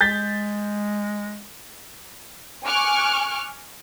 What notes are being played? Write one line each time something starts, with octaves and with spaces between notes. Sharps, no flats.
G#3 G6 A6 B6
G#5 C#6 D6 F6 F#6